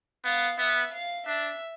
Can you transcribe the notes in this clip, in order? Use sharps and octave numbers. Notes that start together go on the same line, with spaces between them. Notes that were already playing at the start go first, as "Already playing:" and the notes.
B3 F5
B3 E5
F5
D4 E5